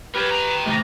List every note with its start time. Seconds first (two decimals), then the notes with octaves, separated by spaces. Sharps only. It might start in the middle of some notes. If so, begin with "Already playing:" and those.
0.15 G4 A#4 B4 C#5
0.31 G5 A#5
0.65 A2 C3 E3